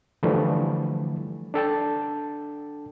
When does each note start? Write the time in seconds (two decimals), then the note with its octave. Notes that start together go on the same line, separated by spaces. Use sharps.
0.23 D3 E3 F3 G3 A3
1.54 D4 A4 G5 A5